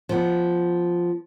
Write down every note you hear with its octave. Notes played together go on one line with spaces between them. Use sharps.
F3 B3